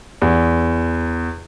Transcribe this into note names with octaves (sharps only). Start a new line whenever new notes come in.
E2